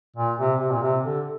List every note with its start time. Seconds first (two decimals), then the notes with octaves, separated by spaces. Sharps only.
0.16 A#2
0.39 C3
0.60 C3
0.71 A#2
0.82 C3
1.04 D3